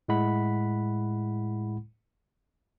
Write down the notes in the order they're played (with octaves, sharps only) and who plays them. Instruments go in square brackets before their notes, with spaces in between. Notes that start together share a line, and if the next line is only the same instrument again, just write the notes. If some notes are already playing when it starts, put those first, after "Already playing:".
[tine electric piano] A2 G#3 E4 F#5 B5 B6